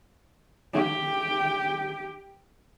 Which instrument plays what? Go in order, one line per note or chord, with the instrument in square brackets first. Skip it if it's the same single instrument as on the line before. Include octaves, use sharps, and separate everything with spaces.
[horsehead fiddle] G4 G5